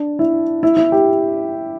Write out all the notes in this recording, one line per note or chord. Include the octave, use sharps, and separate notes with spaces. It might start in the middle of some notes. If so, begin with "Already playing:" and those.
Already playing: D4
E4
E4
E4
G4